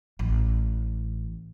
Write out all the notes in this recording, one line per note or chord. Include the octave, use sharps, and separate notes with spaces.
A1